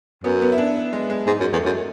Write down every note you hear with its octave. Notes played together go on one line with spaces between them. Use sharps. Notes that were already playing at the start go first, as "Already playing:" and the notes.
F#2 B3
B3
E4
D4
E4
G#3
G#3
G#2 G#3
F#2
E2 A3
F#2